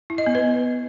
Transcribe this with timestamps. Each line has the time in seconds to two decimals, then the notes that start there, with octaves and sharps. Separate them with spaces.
0.10 E4
0.18 D#5
0.26 B3
0.35 B4